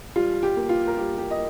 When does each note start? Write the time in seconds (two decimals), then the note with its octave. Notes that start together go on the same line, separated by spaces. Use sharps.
0.16 G3 F4
0.43 G4
0.56 A#3
0.69 F4
0.87 A#4
0.97 G3 G4
1.18 G4
1.31 D#5